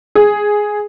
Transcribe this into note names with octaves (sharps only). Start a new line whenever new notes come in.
G#4